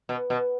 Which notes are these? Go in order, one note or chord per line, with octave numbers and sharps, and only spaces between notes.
B2
B2